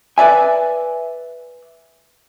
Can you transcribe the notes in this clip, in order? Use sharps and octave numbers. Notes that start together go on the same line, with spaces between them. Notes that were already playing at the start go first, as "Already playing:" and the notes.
B4 D5 E5 G#5